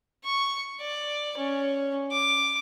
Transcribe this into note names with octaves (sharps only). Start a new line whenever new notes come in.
C#6
D5
C#4
D6